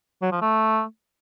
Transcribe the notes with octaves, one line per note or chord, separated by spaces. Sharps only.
F#3
F3
A3